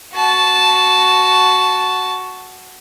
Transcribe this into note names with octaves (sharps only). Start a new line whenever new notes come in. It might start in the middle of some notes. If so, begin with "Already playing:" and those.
F#4 A5